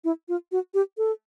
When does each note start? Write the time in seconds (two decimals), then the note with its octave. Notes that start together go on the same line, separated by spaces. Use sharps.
0.04 E4
0.29 F4
0.52 F#4
0.74 G4
0.98 A4